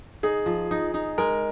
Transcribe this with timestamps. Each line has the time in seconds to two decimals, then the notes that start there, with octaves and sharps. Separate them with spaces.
0.23 D#4 G#4
0.46 F3
0.71 D#4
0.94 D#4
1.18 G#3 A#4